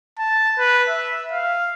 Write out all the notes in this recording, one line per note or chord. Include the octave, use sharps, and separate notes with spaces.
A5
B4
E5
F5